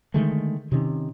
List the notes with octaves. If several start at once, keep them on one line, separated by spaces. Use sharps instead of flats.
D3 D#3 G#3 A3
C3 D#3 C4 C#4